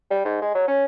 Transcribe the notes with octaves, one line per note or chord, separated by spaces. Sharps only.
G3
G#2
G#3
F#3
C#4